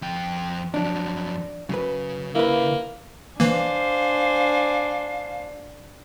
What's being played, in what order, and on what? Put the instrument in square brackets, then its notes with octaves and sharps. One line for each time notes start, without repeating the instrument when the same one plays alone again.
[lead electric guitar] F2 G5
[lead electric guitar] F2 F#3 [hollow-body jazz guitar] D4
[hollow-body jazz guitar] F#2 B4 [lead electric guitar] C#3
[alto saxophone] A#3 [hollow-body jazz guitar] E4 B4
[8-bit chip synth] E3 A#3 [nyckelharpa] D4 [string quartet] C5 G#5 [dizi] F5